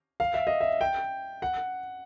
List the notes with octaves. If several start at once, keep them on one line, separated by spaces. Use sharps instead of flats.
F5
E5
D#5
E5
G5
F#5